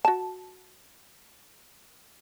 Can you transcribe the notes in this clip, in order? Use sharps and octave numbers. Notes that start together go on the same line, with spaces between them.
F#4 A5